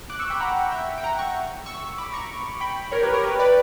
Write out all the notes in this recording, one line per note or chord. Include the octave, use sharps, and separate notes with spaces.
D6 F#6
C#6 E6
G5 B5
F#5 A#5
E5 G5
G5
F#5 A#5
A#5 C#6
C#6 E6
C#6
B5 D6
A#5 C#6
G5 B5
A#4 C#5
G4 B4
A#4 C#5
G4 B4
B4 D5